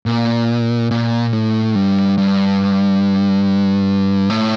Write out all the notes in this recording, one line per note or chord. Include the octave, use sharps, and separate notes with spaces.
A#2
A#2
A2
G2
G2
A2